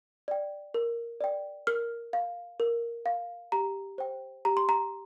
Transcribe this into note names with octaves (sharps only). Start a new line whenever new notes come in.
D5 G5
A#4
D5 G5
A#4 F6
F5
A#4
F5
G4 A#5
C5 G5
G4 A#5
C6
A#5